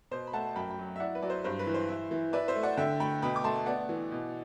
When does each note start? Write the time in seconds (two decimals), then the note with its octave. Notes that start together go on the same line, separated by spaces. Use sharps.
0.11 B2 C5
0.27 B5
0.33 A3 F#5 A5
0.56 F#2 G5 B5
0.70 G5 B5
0.79 F#3
0.96 E5
1.00 E4 D5 F#5
1.15 B4
1.22 F#3 D5
1.30 C5
1.44 G2 C5
1.59 B4
1.67 E3
1.74 C5
1.89 E4
2.11 E3
2.33 E4 B4 D5
2.48 C5 E5
2.56 A3
2.63 D5 F#5
2.77 D3 E5 G5
3.00 A3 G5 B5
3.22 B2 G5 B5
3.36 D6
3.44 A3 A5 C6
3.66 B3 D5 F#5
3.89 E3
4.11 B2